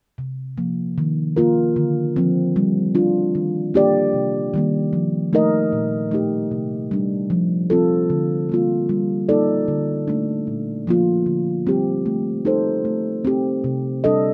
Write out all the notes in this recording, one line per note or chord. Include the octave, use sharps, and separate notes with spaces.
C3
F3 A#3
D#3
A#3 F4 A#4
D3
F3 C4
G3
D4 F4
D#3
A#3 D4 G4 D5
C3
D#3 G3 A#3
F3
A3 D#4 A#4 D#5
A#2
A3 D#4 G4
C3
G3 D4
F3
C4 F4 A4
D3
G3 A#3 F4
G3
A#3 D#4 A4 D5
D3
A3 D4
A#2
F3 A#3 F4
D3
G3 C4 G4
A3
D#4 A4 C5
A3
C4 G4
C3
G3 D4 A4 D#5